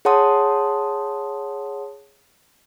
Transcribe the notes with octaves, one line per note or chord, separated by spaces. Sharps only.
G#4 C#5 F#5 A5 C6 D#6